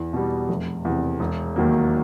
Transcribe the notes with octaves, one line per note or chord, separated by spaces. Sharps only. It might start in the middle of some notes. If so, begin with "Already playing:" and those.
Already playing: E2
B2 G3
F1
E2 C3
E1
D#2 D#3 F#3 A#3